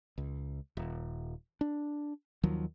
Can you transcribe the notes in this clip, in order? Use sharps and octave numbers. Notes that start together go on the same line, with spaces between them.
C#2
D#1
D4
D#2 D#3 F3 F#3